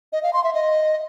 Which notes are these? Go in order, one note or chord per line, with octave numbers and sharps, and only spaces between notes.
D#5
F5
C6
E5
D#5